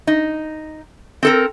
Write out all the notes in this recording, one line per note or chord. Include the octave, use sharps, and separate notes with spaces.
D#4
C4 A4 A#4